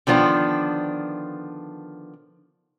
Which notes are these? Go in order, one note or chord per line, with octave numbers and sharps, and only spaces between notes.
D3 D#3 F3 B3 D4